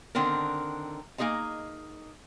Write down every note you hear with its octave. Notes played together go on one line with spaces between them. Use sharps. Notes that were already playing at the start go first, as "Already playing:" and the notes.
D3 D#3 C4 D4 A#4
A#3 D#4 G#4 D#5 A#5